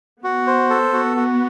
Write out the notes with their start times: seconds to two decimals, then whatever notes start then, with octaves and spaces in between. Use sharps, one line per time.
0.23 B3 F#4
0.47 C5
0.70 A4
0.93 F#4
1.16 F#4